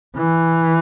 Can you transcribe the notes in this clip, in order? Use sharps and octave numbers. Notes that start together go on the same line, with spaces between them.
E3